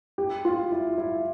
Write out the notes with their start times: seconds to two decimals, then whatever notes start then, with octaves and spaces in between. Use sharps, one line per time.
0.18 G4
0.45 F4
0.72 E4
0.98 E4